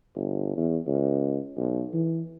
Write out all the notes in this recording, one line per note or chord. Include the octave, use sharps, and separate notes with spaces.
G1
E2
C#2
B1
E3